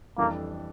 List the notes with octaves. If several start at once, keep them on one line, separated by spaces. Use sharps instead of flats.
F2 E3 G3 A#3 D4 A4